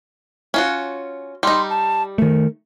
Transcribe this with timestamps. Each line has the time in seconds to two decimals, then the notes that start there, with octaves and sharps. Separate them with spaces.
0.54 C#4 F4 F#4
1.43 G3 D#4 C6
1.69 A5
2.18 D#3 A3 A#4